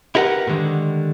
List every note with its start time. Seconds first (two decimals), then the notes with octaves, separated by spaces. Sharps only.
0.15 E4 G4 A#4 B4 F#5
0.47 A2 D3 D#3 G3 G#3